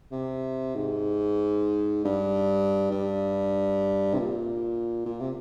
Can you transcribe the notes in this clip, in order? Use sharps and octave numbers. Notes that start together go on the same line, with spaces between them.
C3
G#2
G2
G2
C3
A#2
A#2
C3